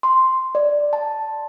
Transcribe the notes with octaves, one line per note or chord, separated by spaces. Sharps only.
C6
D5
A5